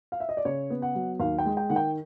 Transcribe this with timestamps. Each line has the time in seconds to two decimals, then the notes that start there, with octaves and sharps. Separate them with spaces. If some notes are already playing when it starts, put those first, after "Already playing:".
0.12 F5
0.20 E5
0.29 D#5
0.37 D5
0.45 C#3 C#5
0.70 B3
0.82 F#5
0.95 F#3
1.20 D#2 F5
1.38 G5
1.46 G#3
1.57 G5
1.70 D#3 F#5
1.76 G5